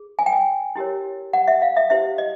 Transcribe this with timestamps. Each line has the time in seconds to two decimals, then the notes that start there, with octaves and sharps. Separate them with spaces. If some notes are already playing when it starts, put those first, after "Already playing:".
Already playing: G#4
0.19 G#5
0.26 G5
0.32 G#5
0.76 E4 G4 A#4 C#5
1.33 F#5
1.48 E5
1.62 F5
1.77 E5
1.90 E4 G4 C5 E5
2.18 D#5